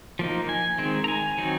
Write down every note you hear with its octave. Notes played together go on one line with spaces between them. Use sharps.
F3 A#3 D#4
G#5
D#3 G#3 C4 D#4
A#5
G#5
D#3 F#3 C4 D#4